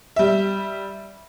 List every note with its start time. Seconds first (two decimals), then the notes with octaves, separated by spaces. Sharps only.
0.16 G3 E5